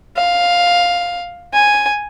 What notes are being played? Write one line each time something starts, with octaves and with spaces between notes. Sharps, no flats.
F5
G#5